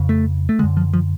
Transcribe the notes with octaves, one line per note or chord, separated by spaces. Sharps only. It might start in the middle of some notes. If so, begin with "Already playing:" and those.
Already playing: F2 C#3
A3
A3
F#2 D3 G#3
F3
F3